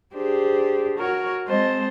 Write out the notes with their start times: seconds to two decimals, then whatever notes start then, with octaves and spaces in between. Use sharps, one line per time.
0.13 D4 G4 G#4 C5
0.96 F#4 A#4 C#5
1.47 G#3 C4 C5 D#5 A5